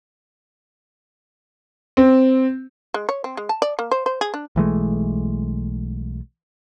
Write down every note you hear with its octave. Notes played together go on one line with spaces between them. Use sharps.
C4
G#3
C#5
C4
G#3
A5
D5
A#3
C5
C5
G#4
D4
B1 E3 G#3 A3